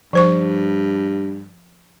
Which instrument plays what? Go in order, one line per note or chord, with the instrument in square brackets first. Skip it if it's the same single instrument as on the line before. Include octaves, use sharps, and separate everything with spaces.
[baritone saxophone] G2 [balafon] F3 C5 C#6